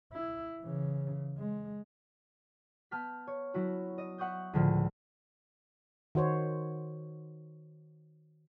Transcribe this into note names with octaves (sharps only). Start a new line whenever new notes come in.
E4
C#3 E3
G#3
B3 A5 F6 G6 B6
C#5
F#3 E4 F#4
D#5
E5 F#5 C#6 D#6 G6
C#2 A2 D3 F3
D#3 F#4 C5 C#5